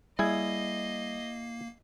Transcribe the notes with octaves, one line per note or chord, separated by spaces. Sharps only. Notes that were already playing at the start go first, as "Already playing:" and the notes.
G3 A#3 E4 G#4 D#5 G#5 C7